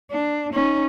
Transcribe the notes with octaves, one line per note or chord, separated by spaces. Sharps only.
D4
C#4 D#4